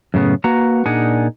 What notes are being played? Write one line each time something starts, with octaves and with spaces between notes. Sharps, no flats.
F#2 A2 C#3 B3
A#3 F#4 B4 F#5 A#5
A#2 D4 D#4 G#4 F#5 G#5